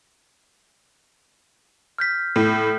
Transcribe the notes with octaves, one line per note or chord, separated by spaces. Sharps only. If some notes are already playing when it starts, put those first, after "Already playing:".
F6 G6 B6
A2